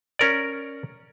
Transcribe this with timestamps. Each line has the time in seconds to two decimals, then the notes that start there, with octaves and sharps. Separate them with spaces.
0.19 C#4 A#4 D5